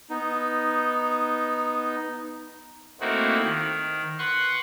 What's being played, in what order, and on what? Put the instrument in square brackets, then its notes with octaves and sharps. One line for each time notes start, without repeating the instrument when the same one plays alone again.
[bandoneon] B3 D#4
[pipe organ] A3 A#3 C4 D#4 E4 F#4
D#3
B4 F#5 C6 C#6